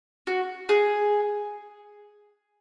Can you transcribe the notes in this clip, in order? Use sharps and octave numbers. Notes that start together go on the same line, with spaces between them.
F#4
G#4